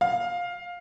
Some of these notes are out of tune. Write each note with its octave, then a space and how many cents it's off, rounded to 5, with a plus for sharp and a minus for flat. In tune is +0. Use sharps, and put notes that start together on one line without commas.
F5 +10